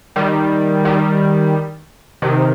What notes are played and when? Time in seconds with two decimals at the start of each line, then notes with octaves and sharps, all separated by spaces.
0.16 D#3 G3
0.85 D#3 G3
2.22 C3 D#3